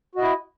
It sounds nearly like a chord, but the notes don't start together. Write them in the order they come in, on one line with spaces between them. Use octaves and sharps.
F#4 D#5 E4